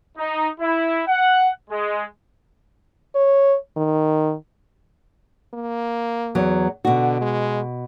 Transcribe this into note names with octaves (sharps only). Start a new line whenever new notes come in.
D#4
E4
F#5
G#3
C#5
D#3
A#3
E2 F#3
B2 D3 F#4
G#3